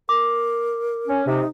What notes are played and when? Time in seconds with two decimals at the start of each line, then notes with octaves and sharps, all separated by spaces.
0.09 A#4 D6
1.08 C#4
1.27 C3 D#4